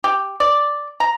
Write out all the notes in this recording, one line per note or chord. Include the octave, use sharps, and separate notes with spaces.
G4
D5
A#5